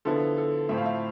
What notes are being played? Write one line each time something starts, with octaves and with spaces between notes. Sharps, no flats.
D3 F3 B3 E4 A4
A4
A2 F3 C4 E4 E5
F5
E5